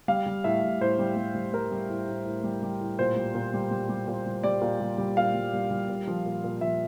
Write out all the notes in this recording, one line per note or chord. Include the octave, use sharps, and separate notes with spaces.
G3 F5
G3
A2 E5
A2
A2 C5
G3
G3
G3
G3 A#4
G3
A2
A2
A2
G3
G3
A2
A#2 C5
G3
A#2
G3
G3
G3
A#2
G3
G3 D5
A#2
G3
G3
A#2 F5
G3
G3
G3
A#2
F3
A#2
A#2
F3 E5